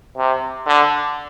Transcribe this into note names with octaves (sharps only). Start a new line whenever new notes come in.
C3
D3